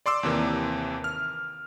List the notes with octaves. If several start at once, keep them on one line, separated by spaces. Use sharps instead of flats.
D5 C6 D6 E6
D#2 C3 E3 A#3
F6